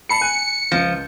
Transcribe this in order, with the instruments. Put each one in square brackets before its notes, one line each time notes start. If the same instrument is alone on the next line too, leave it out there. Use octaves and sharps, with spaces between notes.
[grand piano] A5 B5 C7 [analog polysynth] C#7
[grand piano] G#5 F#6 D#7
[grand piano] C#2 A#6 [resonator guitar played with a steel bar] F3